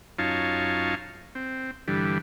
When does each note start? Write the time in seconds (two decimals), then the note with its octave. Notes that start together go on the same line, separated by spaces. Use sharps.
0.19 F#2 D#4 F4 C#5 F5 A5
1.35 C4
1.88 G2 D3 E3 G3